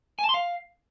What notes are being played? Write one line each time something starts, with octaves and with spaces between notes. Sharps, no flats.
G#5
A5
C6
F5